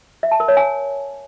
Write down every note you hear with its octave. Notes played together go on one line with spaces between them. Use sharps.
E5
A5
A#4
C#5
G#5